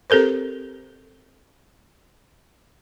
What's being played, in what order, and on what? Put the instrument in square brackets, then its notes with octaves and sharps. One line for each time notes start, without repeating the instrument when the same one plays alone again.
[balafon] C4 G4 A4 A#4 C5